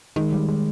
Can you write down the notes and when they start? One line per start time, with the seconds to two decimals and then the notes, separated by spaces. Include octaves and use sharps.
0.16 D#3 G#3
0.32 G3
0.48 G#3